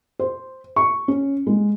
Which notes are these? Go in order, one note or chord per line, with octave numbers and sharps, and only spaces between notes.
C5
C#6
C#4
G#3